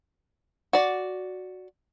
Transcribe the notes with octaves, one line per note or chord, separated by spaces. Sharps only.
F#4 D5